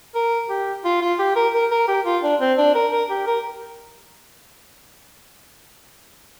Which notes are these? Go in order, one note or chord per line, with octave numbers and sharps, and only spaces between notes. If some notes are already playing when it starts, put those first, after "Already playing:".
A#4
G4
F4
F4
G4
A#4
A#4
A#4
G4
F4
D4
C4
D4
A#4
A#4
G4
A#4